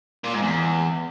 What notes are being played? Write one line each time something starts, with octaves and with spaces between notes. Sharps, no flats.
A#2
G#2
E2